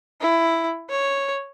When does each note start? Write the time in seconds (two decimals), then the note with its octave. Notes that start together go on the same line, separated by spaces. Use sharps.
0.21 E4
0.90 C#5